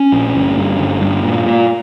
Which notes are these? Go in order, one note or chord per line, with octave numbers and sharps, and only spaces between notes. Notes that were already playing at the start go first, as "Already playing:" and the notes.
Already playing: C#4
A#1
G1
G2
G1
G2
A#2
A#2